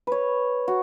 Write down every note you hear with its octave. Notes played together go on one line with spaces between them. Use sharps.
B4 C#5
F#4